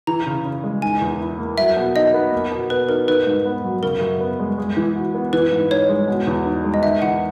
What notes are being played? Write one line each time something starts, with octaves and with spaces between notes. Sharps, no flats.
E3 A#5
C#3
C#3
G#3
D#3 G#5
E2
E4
A#3
F#3 E5
B2
D#4 D#5
B3
A#3
B2
B2 B4
D#4 A#4
D#3 B4
G#2
B3
F#3
C#3 A#4
F#2
B3
G#3
G#3
E3
F#4
B3
E3 B4
G#2
D#4 C#5
G#3
B2
E2
D#4
G#3
D#5
D#3 E5
E2 F#5